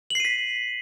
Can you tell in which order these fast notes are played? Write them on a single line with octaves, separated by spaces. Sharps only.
F#7 C7 D#7 B6